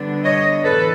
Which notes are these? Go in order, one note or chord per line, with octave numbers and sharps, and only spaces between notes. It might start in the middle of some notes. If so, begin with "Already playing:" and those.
Already playing: D3 G3 B3 D4
C#5 D#5
A2 E3 A4 B4